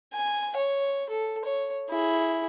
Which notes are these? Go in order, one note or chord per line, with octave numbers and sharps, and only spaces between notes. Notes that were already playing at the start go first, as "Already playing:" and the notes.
G#5
C#5
A4
C#5
E4 G#4